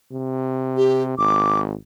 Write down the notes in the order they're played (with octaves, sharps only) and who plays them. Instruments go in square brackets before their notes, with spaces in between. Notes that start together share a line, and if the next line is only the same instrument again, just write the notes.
[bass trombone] C3
[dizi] G4
[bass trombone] G#1 [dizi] D6